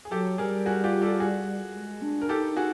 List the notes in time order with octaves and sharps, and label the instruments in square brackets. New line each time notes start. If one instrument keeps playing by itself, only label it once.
[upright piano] G#4
[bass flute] F#3 [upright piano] G4 A4
[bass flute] G3 [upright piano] G#4 A#4
[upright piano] F#4 G#4
F4 G4
G4 A4
F#4 G#4
[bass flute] G#3
D4
[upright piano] A#4
[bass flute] D#4 [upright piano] G4 A4
[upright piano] F#4 G#4